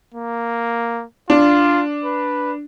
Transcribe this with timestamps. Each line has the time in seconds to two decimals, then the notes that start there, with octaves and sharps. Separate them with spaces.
0.15 A#3
1.30 D4 F4
2.05 B4